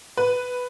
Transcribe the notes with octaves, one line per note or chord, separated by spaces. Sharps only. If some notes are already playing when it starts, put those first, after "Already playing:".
B4